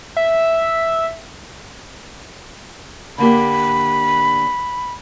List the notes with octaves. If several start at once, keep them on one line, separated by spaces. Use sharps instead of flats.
E5
D3 A#3 G4 B5